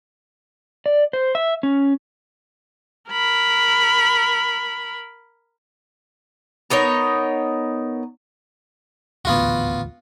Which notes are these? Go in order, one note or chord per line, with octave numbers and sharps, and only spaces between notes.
D5
C5
E5
C#4
A#4 B5
B3 D#4 A#4 C#5
D#1 A1 D2 B3 F4 F#4